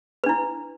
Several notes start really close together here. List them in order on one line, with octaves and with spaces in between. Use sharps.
B4 D4 E4